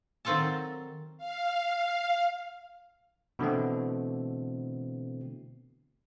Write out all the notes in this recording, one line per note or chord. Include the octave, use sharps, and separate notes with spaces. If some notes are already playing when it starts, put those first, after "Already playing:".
D#3 F#3 C4 F4 A4 A5
F5
B2 D3 E3 A3 C4